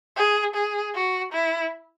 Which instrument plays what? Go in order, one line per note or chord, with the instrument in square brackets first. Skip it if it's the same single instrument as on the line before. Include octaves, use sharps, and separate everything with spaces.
[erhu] G#4
G#4
F#4
E4